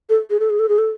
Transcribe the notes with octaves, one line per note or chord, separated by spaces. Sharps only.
A4
G#4
A4
G#4
A4
G#4
A4